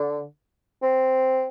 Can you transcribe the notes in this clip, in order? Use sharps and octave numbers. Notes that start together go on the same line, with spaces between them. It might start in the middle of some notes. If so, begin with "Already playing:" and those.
Already playing: D3
C4